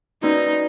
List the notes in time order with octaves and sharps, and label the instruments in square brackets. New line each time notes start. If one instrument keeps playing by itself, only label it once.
[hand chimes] A#3 C#4 F#4 B4 D5 [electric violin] D#4